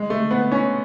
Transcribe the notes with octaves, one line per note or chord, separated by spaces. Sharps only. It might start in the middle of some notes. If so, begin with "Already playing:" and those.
Already playing: G#3
A3
B3
C#4